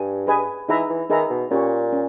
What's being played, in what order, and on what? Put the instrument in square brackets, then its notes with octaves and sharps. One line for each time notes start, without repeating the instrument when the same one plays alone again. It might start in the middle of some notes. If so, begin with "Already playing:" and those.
Already playing: [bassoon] G2 [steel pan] G#5
[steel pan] G#4 B4 D#5 G#5
[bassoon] E3 [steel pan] D#4 G#4 B4 E5 A#5
[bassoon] E3
[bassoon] D#3 [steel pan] D#4 G#4 B4 E5 A#5
[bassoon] B2
[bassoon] A#2 [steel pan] C#4 G4 C#5
[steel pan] C#4